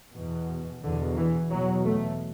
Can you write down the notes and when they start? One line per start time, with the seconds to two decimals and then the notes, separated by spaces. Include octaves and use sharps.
0.15 E2 B2
0.83 E2 B2 D3
1.17 E3
1.50 E2 B2 F#3
1.84 A3